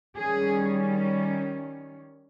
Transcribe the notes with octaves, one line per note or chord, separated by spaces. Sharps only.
D#3 G3 C#4 G#4